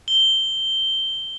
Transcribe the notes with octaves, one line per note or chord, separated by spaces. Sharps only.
G7